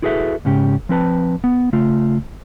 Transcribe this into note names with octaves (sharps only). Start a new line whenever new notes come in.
E4 F#4 G#4 A4 B4 E5
G#2 C#3 C#4 G4
F3 C4 B4 A5
B3
C#3 A3 F4